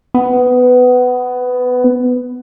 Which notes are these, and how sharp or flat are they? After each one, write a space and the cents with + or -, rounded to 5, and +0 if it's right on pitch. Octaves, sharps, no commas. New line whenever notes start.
B3 +15